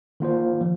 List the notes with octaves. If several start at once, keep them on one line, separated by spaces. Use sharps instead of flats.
D#3 A#3 F4 C5
F3